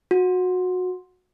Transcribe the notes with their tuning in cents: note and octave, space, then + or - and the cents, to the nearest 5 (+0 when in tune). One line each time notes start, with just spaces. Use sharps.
F#4 -20